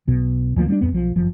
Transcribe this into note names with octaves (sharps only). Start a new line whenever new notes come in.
B1 B2
D2 F3 G#3 A#3
G3 C4 D4
D1 G1 F2 B3
B1 F3
F#1 F3